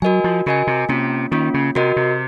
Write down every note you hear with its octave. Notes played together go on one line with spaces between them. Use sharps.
F#3 F#4 A#4 D#5 G#5
F3
C#3 F#4 A#4 D#5 G#5
C3
C3 A#3 C#4 F4
D#3 A#3 C#4 F4
C#3
C3 F#4 A#4 D#5
C3